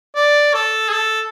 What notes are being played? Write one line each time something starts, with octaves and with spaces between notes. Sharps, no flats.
D5
A4
G#4
A4